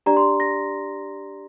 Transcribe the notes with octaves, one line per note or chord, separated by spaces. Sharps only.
D4 G4 D5 A#5
C6
A#6